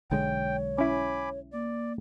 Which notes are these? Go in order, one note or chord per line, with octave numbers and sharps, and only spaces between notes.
B1 D3 G#3 C#5 G5
C#4 E4 G#5 B5 D6
A#3 D5